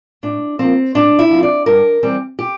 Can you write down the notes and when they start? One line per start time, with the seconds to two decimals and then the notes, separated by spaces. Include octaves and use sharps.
0.23 A2 D4
0.59 F3 A#3 C4
0.95 A2 D4
1.19 E4
1.30 F3 C4
1.43 D5
1.66 G2 A#4
2.03 E3 G3 C4
2.39 G4